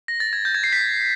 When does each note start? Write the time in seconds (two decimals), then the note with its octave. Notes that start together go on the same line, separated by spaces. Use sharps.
0.08 A#6
0.20 A6
0.33 G#6
0.45 G6
0.55 G#6
0.64 C7
0.73 B6